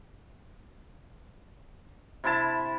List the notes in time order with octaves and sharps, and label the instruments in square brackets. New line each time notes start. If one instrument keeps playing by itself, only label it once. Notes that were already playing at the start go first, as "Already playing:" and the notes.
[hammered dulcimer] C3 E4 A5 B5